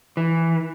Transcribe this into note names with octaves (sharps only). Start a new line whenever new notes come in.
E3